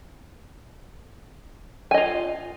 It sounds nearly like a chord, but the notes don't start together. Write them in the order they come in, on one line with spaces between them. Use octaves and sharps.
G#5 D#5 F4